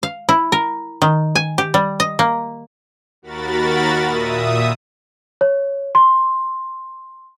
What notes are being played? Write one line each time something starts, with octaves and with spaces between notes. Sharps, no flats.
F5
E4
A#4
D#3
G#5
G4
G3
D#5
A#3
D#2 F#4 A#4 B5 A6
A#2 E5 D#6
C#5
C6